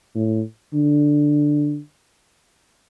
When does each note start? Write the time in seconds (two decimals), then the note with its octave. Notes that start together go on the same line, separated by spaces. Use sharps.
0.15 A2
0.74 D3